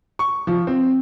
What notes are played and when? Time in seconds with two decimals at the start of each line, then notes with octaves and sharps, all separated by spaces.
0.19 C#6
0.47 F3
0.67 C4